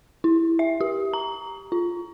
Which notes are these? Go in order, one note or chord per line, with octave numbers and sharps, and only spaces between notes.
E4
E5
G4
A#5
F4